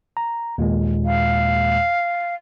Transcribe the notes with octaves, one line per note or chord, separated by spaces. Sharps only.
A#5
D#2 A#2 G#3
F5